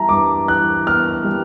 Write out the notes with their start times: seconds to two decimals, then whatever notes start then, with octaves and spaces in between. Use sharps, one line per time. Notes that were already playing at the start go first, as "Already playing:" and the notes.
Already playing: E3 G3 B3 E5 A5 A#5
0.09 G2 D6
0.48 E3 F#6
0.86 B3 F6
1.24 G3